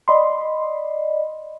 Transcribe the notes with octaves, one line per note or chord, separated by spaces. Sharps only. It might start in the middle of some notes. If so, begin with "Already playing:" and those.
D5 D#5 B5 C6